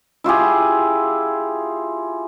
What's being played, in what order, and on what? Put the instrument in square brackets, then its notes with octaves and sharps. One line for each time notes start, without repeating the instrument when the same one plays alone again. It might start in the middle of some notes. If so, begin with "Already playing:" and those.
[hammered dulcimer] E4 F4 G4 G#4